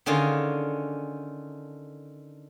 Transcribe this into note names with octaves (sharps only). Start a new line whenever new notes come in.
D3 D#3 C#4 F4 G#4